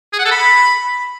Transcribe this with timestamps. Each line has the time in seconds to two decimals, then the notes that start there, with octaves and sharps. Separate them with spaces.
0.13 G#4
0.19 F#5
0.25 A4
0.31 B5